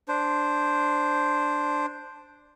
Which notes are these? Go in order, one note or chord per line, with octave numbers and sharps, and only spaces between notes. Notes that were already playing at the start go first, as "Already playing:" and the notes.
D4 C5